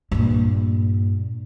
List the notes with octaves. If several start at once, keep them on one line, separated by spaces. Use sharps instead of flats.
G2 A#2